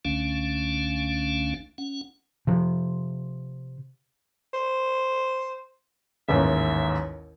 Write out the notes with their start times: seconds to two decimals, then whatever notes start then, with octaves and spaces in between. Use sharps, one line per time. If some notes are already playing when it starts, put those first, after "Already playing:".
0.05 C#2 D3 A3 C#4 D4 F5
1.78 C#4 F#5
2.47 C3 F3
4.54 C5
6.29 A1 D#2 G#2 E5